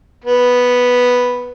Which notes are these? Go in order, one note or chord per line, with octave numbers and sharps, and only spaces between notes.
B3